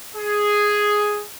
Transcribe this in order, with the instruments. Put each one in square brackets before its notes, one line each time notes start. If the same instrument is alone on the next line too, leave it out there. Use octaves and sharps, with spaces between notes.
[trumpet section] G#4